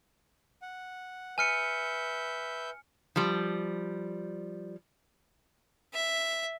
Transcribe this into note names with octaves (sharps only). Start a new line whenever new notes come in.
F#5
B4 E5 G#5 F6 G6 C#7
F3 G3
E5